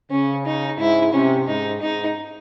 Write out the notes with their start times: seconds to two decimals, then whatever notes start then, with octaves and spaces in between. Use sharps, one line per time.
0.11 C#3 C#4
0.46 D#4
0.79 G#2 E4
1.13 C3 C#4
1.47 G#2 D#4
1.82 G#2 D#4